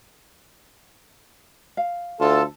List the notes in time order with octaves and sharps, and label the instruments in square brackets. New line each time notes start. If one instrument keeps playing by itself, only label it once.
[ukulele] F5
[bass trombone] D2 [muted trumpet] F4 [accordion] A4 A5